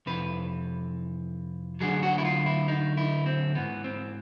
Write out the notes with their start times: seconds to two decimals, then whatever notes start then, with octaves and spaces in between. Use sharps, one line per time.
0.06 F2 C3 E3 B4
1.80 D2 D3 F#3 G#4
2.03 F#4
2.18 E4
2.25 F4
2.46 E4
2.68 D#4
2.97 E4
3.26 C4
3.55 G#2 E3 B3
3.84 C4